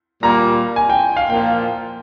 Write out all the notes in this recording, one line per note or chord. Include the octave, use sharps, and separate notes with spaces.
A#2 G3 A#3 A#5
G#5
G5
F5
A#2 F3 A#3 F4 A#4 G5